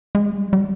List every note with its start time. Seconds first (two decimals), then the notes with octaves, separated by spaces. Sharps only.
0.15 G#3
0.37 G3
0.53 G3